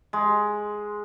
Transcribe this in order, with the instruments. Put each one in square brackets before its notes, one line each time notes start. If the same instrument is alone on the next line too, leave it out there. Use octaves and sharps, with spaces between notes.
[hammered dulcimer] G#3